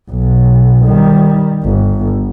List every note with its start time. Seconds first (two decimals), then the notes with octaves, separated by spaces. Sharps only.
0.11 B1
0.85 D#3 G3
1.63 G1